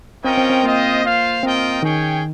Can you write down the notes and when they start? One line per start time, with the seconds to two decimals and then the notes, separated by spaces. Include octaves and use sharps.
0.24 C4 C#4 F4 A#4 D#5 G5
0.38 C4
0.50 C4
0.63 A#3 F4 C5 D#5 G5
1.03 F4 C5 F5
1.43 C4 F4 A#4 D#5 G5
1.83 D#3 C#4 G#4 C#5 G5